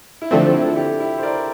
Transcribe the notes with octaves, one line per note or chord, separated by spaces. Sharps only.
E4
D3 F3 A3 C4 D4
E4
A4
E4 G4
E4
C5
A#4 D5